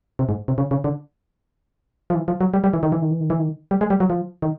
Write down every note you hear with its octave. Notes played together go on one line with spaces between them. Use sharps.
C3
G#2
C3
C#3
C#3
D3
F3
E3
F3
F#3
G3
G3
E3
D#3
E3
D#3
E3
D#3
E3
D#3
G3
G#3
G3
F#3
F3
D#3